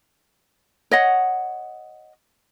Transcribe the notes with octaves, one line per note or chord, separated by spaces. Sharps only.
C#5 D#5 F#5